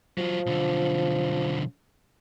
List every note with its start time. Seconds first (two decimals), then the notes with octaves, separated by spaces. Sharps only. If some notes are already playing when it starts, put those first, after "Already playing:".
0.18 F3 F#3 F4
0.46 B1 D3